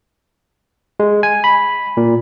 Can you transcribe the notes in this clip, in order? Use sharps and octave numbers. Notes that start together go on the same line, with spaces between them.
G#3
G#5
B5
A#2